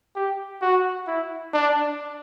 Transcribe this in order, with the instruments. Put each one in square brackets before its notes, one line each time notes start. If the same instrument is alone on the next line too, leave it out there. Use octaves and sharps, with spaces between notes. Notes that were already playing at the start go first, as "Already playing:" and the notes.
[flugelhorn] G4
F#4
E4
D4